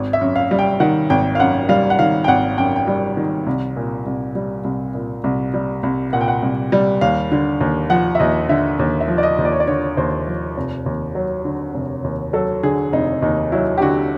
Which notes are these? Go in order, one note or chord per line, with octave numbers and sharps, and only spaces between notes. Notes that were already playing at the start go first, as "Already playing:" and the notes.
Already playing: G#1
E5
F#2
F5
G3
G5
D#3 F#5
G#1 G5
F5
F#2 F#5
G3 F5
F#5
D#3 F5
G5
G#1 F#5
F#2 G5
G5
G3
D#3
C2
A#2
C2
G3
C2
A#2
C2
G3
C2
A#2 F#5
G5
F#5
C2
G3
D#2 F5
D3
D#2
F3 F#5
E5
D#2 D#5
D3 E5
D#2
E5
F3
D5
D#5
D#2
D5
C#5
D5
D3 C#5
D#2 C5
F3
F1
D#2
F#3
D3
F1
D#2
F#3 A4
D3 G#4
F1 D#4
D#2 D#4
F#3 E4
G4
D3 F#4